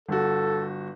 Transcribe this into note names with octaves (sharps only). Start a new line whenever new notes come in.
G1 F#4 A4